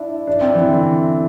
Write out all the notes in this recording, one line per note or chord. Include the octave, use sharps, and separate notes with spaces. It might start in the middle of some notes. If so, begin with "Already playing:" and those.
Already playing: D4 E4
D4
C4
E3
D3